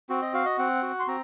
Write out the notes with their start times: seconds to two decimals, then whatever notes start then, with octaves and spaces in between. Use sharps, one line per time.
0.09 C4 F#4
0.22 D#5
0.34 F#4 F5
0.46 D#5
0.58 C4 F#5
0.82 F#4
1.00 C6
1.08 C4 A#5